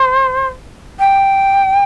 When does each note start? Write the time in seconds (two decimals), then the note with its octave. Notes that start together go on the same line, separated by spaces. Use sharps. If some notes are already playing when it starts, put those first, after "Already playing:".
Already playing: C5
0.99 G5